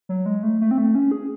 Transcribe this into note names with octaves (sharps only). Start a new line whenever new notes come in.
F#3
G#3
A3
A3
C4
A3
C#4
G#4